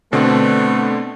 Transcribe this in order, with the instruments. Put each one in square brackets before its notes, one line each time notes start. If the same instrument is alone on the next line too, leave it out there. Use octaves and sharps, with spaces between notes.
[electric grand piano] B2 D3 C4 [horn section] A3 B3